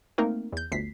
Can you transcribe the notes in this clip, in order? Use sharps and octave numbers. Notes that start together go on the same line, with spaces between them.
A3 A#3 C4 D#4 A#4
E2 G6
G1 D2 B6 C7